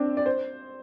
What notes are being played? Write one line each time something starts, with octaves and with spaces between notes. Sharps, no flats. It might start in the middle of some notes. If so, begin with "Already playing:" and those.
Already playing: C4 D4
D5
C5